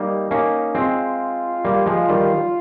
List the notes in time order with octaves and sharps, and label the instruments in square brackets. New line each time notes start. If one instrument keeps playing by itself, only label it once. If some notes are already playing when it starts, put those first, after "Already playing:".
Already playing: [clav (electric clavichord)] G3 A#3 [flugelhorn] D#4
[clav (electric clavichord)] A#3 C#4 [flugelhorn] D#4
[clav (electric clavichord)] G#3 C4 [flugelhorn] F4
[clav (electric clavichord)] G3 A#3
F3 G#3
D#3 G3